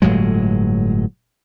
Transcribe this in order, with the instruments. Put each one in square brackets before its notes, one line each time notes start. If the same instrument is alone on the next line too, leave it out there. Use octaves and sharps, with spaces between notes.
[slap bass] G1 A2 F#3 G#3